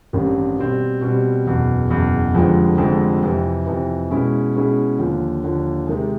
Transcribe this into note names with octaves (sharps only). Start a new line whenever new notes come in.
A1 G2 D#3 G3 C4
B2 G3 C4
B2 G3 C4
F#1 E2 B2
F#1 E2 B2
F1 F2 D3 F3 G#3
F1 F2 D3 F3 G#3
F2 C3 E3
F2 C3 E3
B2 G#3 C#4 E4 G#4
B2 G#3 C#4 E4 G#4
D#2 D3 F3
D#2 D3 F3
C3 D#3 G#3